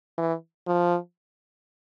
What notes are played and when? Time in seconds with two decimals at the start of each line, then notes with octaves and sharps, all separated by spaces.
0.18 E3
0.67 F3